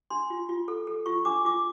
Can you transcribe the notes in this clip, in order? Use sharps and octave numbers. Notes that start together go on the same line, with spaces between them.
D4 C6
F4
F4
A4
A4
F4 C#6
D4 D6
F4 D6